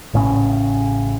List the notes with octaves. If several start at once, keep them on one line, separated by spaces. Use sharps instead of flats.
A1 A2 C#3 C#4